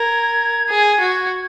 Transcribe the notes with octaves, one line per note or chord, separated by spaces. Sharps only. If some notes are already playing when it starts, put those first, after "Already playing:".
Already playing: A#4 G#6
G#4
F#4